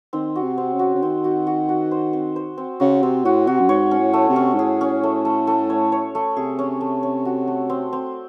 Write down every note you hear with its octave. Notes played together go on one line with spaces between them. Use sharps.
D#3 C4
F#4
C3
C4
C#3
F#4
C#3
D#3 C4
F#4
F#4
F#4
C5
C4
C5
C4
C#3 F#4
C3 C4
A2 F#4
C3 F#4
F#2
G#2 C#5
C#4
A2
A3
C3
C#4
G#2
A2 G#4
C#4
A3
A3
A3
C#5
C#5
A3
C3 G#4
C#4
A3
C#4
F#4
A3
C4
C4